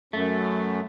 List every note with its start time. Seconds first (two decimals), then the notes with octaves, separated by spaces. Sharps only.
0.13 F#2 A3